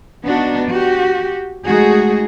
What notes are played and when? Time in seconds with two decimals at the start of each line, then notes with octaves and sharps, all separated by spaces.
0.24 B3 D4 D#4 F#4
0.68 F#4 G4
1.66 G#3 A3 D#4 F#4 G#4